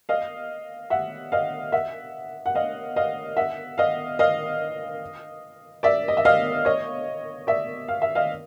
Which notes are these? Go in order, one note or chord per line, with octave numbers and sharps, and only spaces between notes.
D#5 F5
E5 F#5
D#5 F5
E5 F#5
F#5
D#5 F5
D#5 F5
E5 F#5
D#5 F5
D#5 F5
D5 E5
D#5
E5
D#5 F5
C#5 D#5
D5 E5
F5
E5
D#5 F5